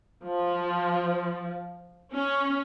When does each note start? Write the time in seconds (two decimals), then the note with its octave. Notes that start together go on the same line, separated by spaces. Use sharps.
0.24 F3
2.14 C#4